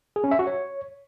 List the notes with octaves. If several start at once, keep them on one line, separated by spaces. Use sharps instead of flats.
G#4
C#4
E5
F#4
C#5